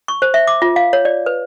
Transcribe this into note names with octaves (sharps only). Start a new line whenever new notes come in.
C#6
C5
E5
D6
F4
F5
C#5
D5
B4